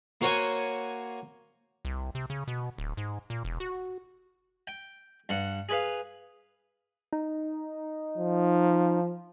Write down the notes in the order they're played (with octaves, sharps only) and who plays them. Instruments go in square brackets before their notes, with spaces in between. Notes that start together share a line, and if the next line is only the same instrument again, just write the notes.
[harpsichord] A#3 F#4 C5 C#5 F#5 G#5
[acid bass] C2
C3
C#3
B2
D1
G#2
A#2
E1
F#4
[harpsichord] G5
G2 F#5
G#4 B4 F5
[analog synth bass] D#4
[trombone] F3